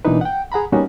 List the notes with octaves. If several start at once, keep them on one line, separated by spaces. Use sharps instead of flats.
B2 E3 A#3 D4 D#4 B4
F#5 G5
G#4 F#5 A#5 B5
G3 A#3 B3 C#4 D#4 F#4